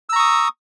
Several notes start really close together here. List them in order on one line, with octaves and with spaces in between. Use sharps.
E6 A#5 C#6 D#6